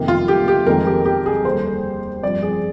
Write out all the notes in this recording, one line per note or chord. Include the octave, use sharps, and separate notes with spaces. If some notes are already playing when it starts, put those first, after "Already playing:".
Already playing: F2 C3 D#3 A#3
F4
G4
G4
F2 D#3 G#3 C4 A#4
G4
G4
G#4
D#2 D3 G3 C5
G2 F3 C4 D5
G#4